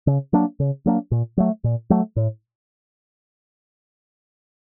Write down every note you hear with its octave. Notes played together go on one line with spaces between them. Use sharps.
C#3
F#3 A#3 D4
C#3
F#3 A#3 D4
A#2
F#3 A3
A#2
F#3 A3
A2